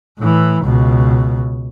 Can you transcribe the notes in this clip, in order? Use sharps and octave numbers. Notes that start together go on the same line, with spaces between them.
A2 E3
C#2 B2